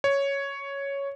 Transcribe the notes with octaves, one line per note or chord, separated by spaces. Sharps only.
C#5